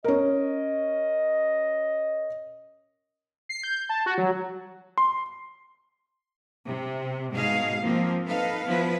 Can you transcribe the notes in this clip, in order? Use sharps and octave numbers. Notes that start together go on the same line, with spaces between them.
C#4 A#4 D#5
C7
G6
A5
F#4
F#3
C6
C3
G#2 B2 D#4 G#4 F5
F3 A#3 C4
D#4 A4 B4 F5
F3 B3 E4 B4